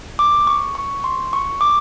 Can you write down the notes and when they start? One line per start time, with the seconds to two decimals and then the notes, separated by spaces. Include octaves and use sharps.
0.19 D6
0.47 C#6
0.75 C#6
1.04 C6
1.33 C#6
1.61 D6